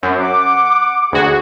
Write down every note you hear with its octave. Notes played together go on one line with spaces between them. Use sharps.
F#2 C5 E5
F#5 D6
D2 F#4 G#4